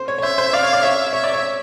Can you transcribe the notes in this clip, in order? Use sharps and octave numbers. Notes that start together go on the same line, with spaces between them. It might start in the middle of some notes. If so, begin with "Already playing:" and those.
Already playing: C5
C#5
C#5
C5 E5
C5
D5 F5
C#5
D5
C#5 E5
C#5 E5
D5
C#5